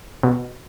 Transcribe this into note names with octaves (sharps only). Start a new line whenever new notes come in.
B2